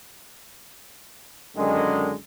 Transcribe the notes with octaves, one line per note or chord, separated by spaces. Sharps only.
F#2 D3 D#3 G#3